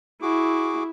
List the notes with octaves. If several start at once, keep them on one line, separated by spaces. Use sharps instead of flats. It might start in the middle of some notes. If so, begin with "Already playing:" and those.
E4 F#4 G#4 D6